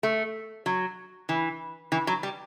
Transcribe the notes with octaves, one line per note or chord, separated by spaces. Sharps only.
A3
F#3
E3
E3
F#3
G3